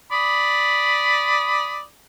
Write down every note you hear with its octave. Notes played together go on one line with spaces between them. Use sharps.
D5 B5 D#6